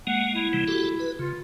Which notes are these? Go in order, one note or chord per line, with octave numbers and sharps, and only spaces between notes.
G#3 A#3 F#5
E4
C3 E3 G3
F#4 G4 A4
B4
C#3 F4